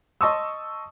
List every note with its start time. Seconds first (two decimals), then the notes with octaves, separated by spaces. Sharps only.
0.21 D#5 A5 C6 C#6 D#6 E6